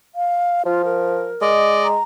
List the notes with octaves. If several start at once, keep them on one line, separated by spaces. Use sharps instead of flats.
F5
F3 F4
A#4
G#3 D5 D#5
A#5